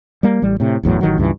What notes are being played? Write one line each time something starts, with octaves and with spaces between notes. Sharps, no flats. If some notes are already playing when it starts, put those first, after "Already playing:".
G3 A#3
A1 G3
A2 C3
G1 E2 A2 F#3
A1 D#3 F#3
C#2 G2 E3